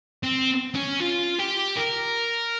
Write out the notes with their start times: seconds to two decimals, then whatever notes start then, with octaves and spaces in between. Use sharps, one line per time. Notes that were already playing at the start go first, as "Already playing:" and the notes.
0.23 C4
0.75 C#4
1.00 F4
1.39 G4
1.77 A#4